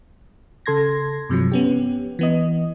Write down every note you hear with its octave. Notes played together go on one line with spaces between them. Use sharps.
C#3 A4 C6 G#6 A#6
G2 C3 F3 F#3
B3 C#4 G4
E3 B3 D#5